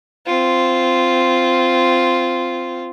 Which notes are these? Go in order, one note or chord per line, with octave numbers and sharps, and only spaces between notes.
C4 F4